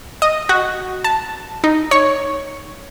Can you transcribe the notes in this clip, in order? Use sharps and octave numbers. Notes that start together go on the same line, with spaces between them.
D#5
F#4
A5
D#4
C#5